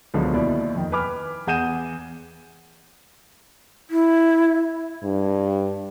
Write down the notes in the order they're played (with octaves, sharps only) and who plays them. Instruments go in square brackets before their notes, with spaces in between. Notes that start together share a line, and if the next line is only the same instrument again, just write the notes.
[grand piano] C#2 B2 D3 F3 F#3 G#3
D#2 B2 E4 D5
F2 D#3
B4 G#5 B5 D6 F6
E2 G#4 F#5 G6 D#7 E7
[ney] E4
[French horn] G2